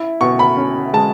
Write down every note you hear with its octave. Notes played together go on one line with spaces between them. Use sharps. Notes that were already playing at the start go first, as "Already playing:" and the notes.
Already playing: E4
B2 C#6
B5
C#4
G#3 A5